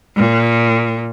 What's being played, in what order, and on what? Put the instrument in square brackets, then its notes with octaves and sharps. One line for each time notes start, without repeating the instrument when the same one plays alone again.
[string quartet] A#2